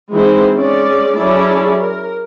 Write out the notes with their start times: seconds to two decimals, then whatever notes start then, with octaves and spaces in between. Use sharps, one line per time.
0.12 E3 G#3 C4 D#4 E4 C5
0.53 G#3 C#4 D5
1.15 F#3 C#4 E4 G#4 A4 D5
1.79 A#4